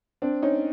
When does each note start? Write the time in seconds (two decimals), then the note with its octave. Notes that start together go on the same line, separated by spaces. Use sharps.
0.22 C4 D4
0.42 C#4 D#4